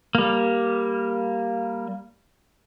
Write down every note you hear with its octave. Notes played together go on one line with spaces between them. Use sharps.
G3 A#3